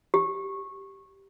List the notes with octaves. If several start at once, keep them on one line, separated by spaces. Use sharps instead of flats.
G4